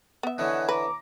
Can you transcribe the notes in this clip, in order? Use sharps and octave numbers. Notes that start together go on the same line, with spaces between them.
B3 E5
D3 E3 C#4 C#5 D#5 F#5
B4 A#5 D6